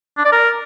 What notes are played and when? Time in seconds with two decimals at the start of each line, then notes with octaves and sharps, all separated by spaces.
0.18 D4
0.25 D5
0.32 A#4